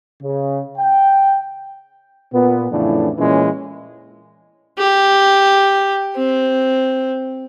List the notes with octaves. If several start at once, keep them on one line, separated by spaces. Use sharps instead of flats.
C#3
G5
A#2 B3
F2 A2 C#3 E3 D4
A#2 E3 G#3 C#4
G4
C4